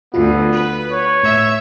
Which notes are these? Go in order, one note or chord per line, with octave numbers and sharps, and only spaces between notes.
D2 B3 F4
B4
C#5
A2 E5